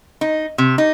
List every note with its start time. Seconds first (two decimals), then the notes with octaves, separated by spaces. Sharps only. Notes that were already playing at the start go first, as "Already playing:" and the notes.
0.21 D#4
0.58 C3
0.78 D#4